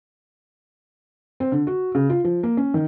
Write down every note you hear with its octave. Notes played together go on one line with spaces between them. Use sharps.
C4
D3
F#4
C#3
F4
F3
A#3
C#4
D#3